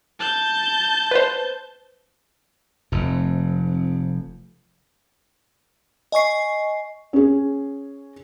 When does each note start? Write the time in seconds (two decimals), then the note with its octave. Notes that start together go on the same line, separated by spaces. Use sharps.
0.19 A5 G6
1.11 B4 C5
2.92 F1 F2
6.12 D#5 G#5 C#6 C7
7.13 C#4 G#4